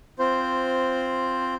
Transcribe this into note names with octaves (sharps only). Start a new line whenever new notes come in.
C4 F4 C5